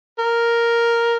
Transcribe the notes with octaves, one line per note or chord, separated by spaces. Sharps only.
A#4